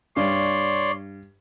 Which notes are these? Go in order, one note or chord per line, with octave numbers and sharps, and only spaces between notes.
G2 C#5 D5 C6